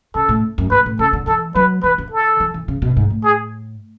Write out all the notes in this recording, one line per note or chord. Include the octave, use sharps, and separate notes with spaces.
C#3 A4
A2
F#2
G#2 B4
A2
C#3 A4
D3
E3 A4
F#3 B4
E3 B4
D3
A4
E3
E3
C#3
B2
G#2
A2
G#4